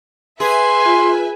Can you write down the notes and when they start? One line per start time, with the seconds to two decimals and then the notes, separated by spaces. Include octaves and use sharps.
0.40 G#4 B4 E5 G#5 C6
0.86 F4